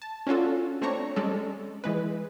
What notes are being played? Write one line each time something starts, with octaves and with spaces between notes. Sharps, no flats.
A5
C#4 D4 F4 F#4 A4
A3 C4 D4 C#5 A#5 C#6
G3 G#3 C#4 A4 D5
E3 G#3 B4